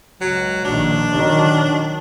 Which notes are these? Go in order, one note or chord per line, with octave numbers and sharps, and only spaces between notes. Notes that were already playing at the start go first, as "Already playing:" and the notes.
C#2 F#3
A#1 D#3 D4
D#3 F#3